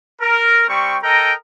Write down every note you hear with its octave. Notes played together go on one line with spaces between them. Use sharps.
A#4
G3 C4 G5 C#6
A4 A#4 D#5 G5 A#5